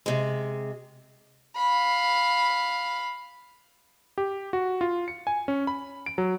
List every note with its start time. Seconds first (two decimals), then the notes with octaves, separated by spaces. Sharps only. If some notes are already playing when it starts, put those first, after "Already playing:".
0.06 C3 G#3
1.57 F5 B5
4.18 G4
4.53 F#4
4.81 F4
5.08 C#7
5.27 G#5
5.48 C#4
5.67 B5
6.06 D7
6.18 F#3